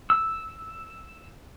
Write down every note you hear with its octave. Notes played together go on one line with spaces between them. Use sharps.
E6